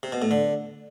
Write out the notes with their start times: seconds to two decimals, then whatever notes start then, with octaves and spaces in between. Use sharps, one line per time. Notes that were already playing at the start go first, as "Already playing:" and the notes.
0.03 C3
0.12 B2
0.22 A2
0.31 D3